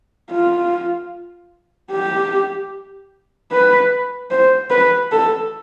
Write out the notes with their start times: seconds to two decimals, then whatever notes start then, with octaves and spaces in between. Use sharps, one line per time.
0.31 F4
1.91 G4
3.51 B4
4.31 C5
4.70 B4
5.11 A4